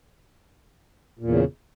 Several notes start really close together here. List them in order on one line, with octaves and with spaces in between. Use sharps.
A#2 E2 C#3